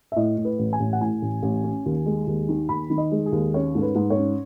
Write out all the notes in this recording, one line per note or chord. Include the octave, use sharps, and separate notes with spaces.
E5
A2 D#5
A2
B4
A1
G#5
A1
F#5
A2 G#5
A1
A1
C#4
D#2
G#3
D#2
D#3
D#2 B5
D#3
D#5
G#3
G#4
D#2
C#4 C#5
G#2 A4
B4
G#2
C#5
C#4